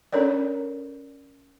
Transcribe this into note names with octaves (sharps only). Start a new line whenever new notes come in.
C#4 D4 A4 A#4 C#5 D5